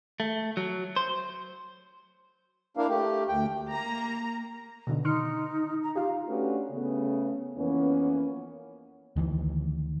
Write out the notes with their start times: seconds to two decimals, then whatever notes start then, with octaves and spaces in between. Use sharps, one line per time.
0.20 A3
0.57 F#3
0.96 C5
2.77 A#3 D4 E4 A#4 F5
2.89 A3 G4
3.28 D2 G5
3.70 A#3 A#5
4.87 B2 D3 D#3
5.05 D#4 C6 F6 C#7
5.83 A#5
5.96 F4 G4 F5
6.28 A3 C#4 D4 F#4 G4 B4
6.71 C#3 A3 B3
7.57 F2 E3 A#3 B3 C#4
9.16 D2 D#3 E3